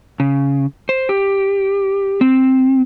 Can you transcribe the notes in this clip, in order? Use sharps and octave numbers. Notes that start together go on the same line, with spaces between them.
C#3
C5
G4
C4